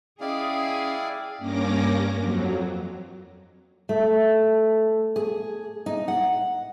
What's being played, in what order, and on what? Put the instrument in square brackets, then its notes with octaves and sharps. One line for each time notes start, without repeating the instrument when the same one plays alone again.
[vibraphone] C#4 D#5 G5 [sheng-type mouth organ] E4 D5 F5 [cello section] G#4
[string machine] G2 A#3 C#4 D6 A#6
F2 F#3
[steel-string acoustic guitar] A3
G#4
D#4
F#5